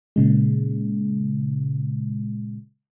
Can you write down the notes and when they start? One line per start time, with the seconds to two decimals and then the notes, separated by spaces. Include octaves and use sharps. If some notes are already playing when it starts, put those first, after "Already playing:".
0.16 A#2 C#3 G#3